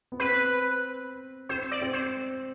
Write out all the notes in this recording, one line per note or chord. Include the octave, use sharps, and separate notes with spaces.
B3
C4 B4
C4 C5
D5
C4
C5